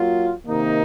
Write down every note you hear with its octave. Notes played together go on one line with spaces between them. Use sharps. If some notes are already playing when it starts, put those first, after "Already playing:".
Already playing: F#3 A#3 F4
C3 D#3 A#3 D#4